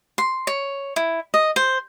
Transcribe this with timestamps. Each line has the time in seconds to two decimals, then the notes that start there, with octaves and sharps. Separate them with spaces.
0.18 C6
0.47 C#5
0.96 E4
1.34 D#5
1.56 C5